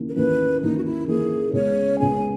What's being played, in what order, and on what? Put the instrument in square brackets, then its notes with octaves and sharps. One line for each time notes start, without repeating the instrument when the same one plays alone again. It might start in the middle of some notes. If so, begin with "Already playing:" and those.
Already playing: [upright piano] D#2 C#3 E3 A#3
[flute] A#4
[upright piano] D#2 C#3 E3 A#3 [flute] B4
[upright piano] D#2 C#3 E3 A#3 [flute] D#4
[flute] F#4
E4
[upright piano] D#2 C#3 E3 A#3 [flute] G#4
[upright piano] C#2 C#3 G#3 B3 [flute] C#5
[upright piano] C#2 C#3 G#3 B3 [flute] G#5